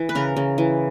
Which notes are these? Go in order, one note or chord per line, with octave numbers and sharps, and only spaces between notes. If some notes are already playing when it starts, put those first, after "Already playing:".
Already playing: E3
B4
C#3 A#4
C#3
E3